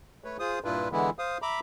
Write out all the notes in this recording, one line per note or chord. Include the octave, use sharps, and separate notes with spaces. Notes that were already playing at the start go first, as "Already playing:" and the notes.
A3 B4 C#5
F4 G#4 C5 D#6
G2 A#2 D4 E4 F4 B4
D3 E3 G#3 B3 E4
C5 F5 D#6
E5 A#5 B5 D6